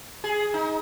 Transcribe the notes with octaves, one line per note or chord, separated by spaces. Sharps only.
G#4
D#4